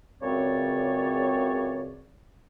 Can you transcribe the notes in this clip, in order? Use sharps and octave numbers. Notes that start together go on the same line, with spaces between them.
C#2 F#2 C#3 C4 C#5 D5